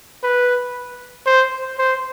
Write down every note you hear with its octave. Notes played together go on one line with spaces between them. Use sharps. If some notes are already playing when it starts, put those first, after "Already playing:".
B4
C5
C5